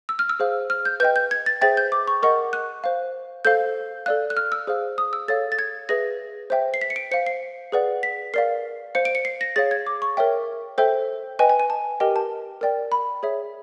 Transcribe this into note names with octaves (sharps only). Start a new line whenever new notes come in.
E6
F6
E6
G#4 C5 F5
F6
G6
B4 D#5 G5 G6
G6
G#6
A6
G#4 C5 E5 G5 A6
G6
D6
C#6
A#4 D#5 F#5 C#6
F#6
C5 F5
A4 C5 F5 G6
A4 D5 F5 F#6
F#6
F6
E6
G#4 C5 F5
D#6
E6
A4 C#5 F5 A6
A6
G#6
G#4 B4 E5 A#6
C5 E5 G5
C7
B6
C#7
D7
C5 F5 C#7
C7
G#4 B4 D5 F#5
B6
A#4 D5 F5 C7
C5 F5 C#7
D7
C#7
C7
A#6
G#4 C#5 F5 A6
G#6
D6
C#6
A#4 C#5 E5 G5
A4 C5 E5 G5
B4 D#5 G5 G#5
G#5
G#5
A5
G4 A#4 D#5 G5
A5
A#4 D5 G5
B5
G#4 C#5 E5